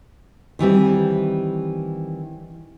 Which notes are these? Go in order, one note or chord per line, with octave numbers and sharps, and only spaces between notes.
D#3 E3 G3 C4